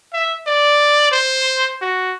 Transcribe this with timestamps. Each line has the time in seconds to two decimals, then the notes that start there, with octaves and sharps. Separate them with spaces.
0.13 E5
0.47 D5
1.12 C5
1.81 F#4